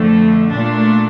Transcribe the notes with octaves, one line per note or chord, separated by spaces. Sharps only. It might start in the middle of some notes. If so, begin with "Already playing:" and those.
Already playing: F2 D3 A3
A#2 A3 D4